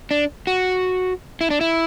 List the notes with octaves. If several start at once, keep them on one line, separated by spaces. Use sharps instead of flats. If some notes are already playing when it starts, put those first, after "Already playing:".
D4
F#4
E4
D4
E4